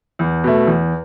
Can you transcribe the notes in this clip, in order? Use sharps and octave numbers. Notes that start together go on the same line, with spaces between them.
E2
B2 A3
E2